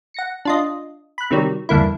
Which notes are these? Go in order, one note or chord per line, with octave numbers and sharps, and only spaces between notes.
F#5 A#6 C#7
D4 F4 D#5
B5 F#6
C3 D#3 F#3 G3
E2 G2 D3 A#3 E4